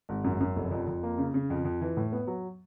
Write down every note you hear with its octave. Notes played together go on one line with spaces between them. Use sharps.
G#1
F#2
F#2
F1
F2
F2
A#3
C#3
C#3
F2
F2
E3
A2
B3
F#3